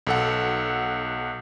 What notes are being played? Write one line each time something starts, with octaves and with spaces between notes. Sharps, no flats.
B1 A4 F#5